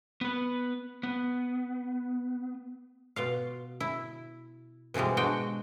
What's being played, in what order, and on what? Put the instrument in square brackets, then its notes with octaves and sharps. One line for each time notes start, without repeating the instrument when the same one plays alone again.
[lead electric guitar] B3 B4
B3
[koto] B2 F4 F5
E4
B2 E3 F3 G3 G#3
G#3 D4 F#4 G5